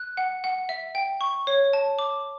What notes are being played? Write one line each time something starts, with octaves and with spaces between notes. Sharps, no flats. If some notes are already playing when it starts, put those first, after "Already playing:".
Already playing: F#6
F#5
F#5
E5
G5
C#6
C#5
A5
D6